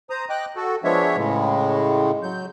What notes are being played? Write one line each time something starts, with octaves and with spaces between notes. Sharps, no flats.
C5 A#5 D#6
D#5 G5 D6 F#6
F#4 A4
F3 G#3 B3 D4 C#5 E5
A2 C#3 G#3
F#3 G6